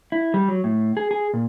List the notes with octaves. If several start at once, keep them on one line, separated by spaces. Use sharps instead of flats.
E4
G3
F#3
A2
G#4
G#4
A#2